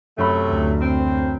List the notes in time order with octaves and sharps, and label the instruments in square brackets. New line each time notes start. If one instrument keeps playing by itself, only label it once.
[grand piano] F#2 B5 [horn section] C3 F#3 A3
[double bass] D2
[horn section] C4